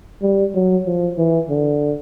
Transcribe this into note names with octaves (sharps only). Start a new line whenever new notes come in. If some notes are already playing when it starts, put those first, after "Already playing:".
G3
F#3
F3
E3
D3